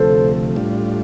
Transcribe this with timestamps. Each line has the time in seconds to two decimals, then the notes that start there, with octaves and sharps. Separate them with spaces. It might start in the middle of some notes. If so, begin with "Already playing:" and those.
Already playing: D2 C3 F3 A3 A4 C5
0.56 A2 G3 D4 F4